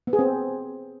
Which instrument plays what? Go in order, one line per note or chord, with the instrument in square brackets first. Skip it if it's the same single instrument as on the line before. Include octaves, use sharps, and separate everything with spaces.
[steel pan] B3
G#4
C4